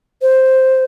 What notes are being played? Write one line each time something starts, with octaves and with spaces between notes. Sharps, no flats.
C5